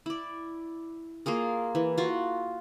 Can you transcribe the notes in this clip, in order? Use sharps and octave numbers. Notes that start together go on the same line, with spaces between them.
E4 D5
A#3 F4 G#4 A#4
E3
F4 F#4